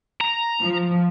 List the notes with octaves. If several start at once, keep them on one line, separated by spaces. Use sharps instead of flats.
A#5
F3